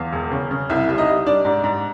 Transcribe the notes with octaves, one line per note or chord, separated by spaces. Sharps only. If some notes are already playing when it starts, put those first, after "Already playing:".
Already playing: E2 F4 F5
E1
C#3
C#3
C2 E4 E5
G3 E5
D#4 D#5
G3
G3 D4 D5
G#2
G#2